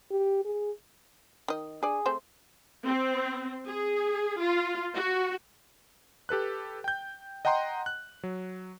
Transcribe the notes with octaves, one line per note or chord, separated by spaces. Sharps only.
G4
G#4
D#3 D#5
D4 G#4 D5
A3 C4 C5
C4
G#4
F4
F#4
G4 A4 B4 F#6
G5 G6
D#5 F#5 G5 A#5 C6
F#6
F#3